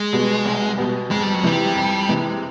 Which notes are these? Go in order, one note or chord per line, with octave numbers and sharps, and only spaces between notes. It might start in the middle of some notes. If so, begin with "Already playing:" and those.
Already playing: G#3
B2 G3 B3
C2
B2 G3 B3
F2 G#3
G3
F#3
C3 E3 G3 G#3
F2
C3 E3 G#3